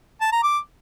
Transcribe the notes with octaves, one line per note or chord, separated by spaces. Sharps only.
A5
A#5
D6